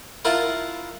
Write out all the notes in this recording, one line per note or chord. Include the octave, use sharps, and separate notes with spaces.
E4 F4 A#4 F5 F#5 A5